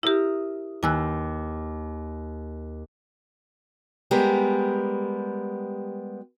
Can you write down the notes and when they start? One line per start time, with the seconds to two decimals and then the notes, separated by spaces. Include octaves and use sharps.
0.03 E4 G4 A#4 E5 D#6
0.83 D#2 B4 G#5 E6 F#6
4.11 G3 G#3 B3 G4 A#4